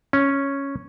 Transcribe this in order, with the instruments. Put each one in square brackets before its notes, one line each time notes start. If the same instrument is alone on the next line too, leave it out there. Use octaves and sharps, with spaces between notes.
[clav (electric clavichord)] C#4